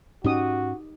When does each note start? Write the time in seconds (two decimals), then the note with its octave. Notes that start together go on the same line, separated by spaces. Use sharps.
0.24 G#2 C#4 D#4 F#4 G4 D#6